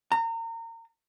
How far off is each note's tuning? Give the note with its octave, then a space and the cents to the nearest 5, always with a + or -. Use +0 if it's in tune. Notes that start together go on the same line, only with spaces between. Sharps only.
A#5 -30